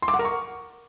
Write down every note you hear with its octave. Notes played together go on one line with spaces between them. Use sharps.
C6
D6
F#5
A#4
C#6